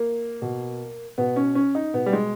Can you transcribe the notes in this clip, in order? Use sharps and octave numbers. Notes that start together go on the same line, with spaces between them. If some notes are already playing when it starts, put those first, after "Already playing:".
Already playing: A#3
B2
B2 B3
C#4
C#4
D#4
B2 B3
G3
G#3